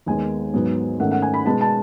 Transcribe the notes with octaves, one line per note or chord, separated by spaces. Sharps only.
D#2 D#3 G#3 B3 G#5
G#2 F#3 B3
G#2 D#3 A3 C#4 F#5
F#5
G#5
B5
B2 G#3 B3 A5
A5